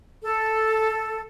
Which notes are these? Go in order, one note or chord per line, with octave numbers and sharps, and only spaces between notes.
A4